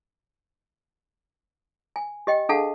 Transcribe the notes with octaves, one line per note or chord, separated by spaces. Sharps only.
G#5
G4 D#5 G5
D4 G#4 A4 F5 F#5 A5